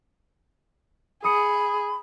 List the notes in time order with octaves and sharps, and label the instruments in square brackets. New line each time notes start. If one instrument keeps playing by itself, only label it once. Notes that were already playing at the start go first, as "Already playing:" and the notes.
[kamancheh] G#4 [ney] B5 [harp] D#6 C#7 D#7